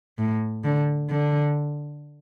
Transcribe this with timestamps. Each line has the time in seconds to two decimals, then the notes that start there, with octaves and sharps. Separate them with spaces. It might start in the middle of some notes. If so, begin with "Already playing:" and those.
0.18 A2
0.64 D3
1.10 D3